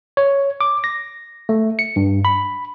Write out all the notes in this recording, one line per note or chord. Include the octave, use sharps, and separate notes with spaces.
C#5
D6
A#6
A3
C#7
G2
B5